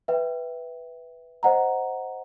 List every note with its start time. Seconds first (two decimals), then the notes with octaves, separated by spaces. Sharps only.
0.08 B4 E5 G5
1.43 C5 D#5 F#5 A#5